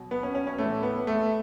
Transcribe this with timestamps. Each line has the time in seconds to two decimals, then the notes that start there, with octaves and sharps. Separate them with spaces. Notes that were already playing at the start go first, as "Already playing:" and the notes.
Already playing: B2 F#3
0.11 B3
0.23 C#4
0.35 C#4
0.47 C#4
0.58 A2 E3 A3
0.83 B3
1.07 A3